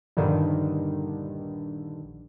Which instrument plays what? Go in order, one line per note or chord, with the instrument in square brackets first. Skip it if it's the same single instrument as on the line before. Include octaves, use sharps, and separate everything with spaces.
[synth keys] A#1 G2 D3 D#3